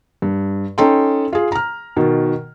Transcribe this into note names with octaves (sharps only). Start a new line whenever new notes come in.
G2
C#4 D#4 A4 G5 C6
F4 G#4
A#5 F6
B2 D#3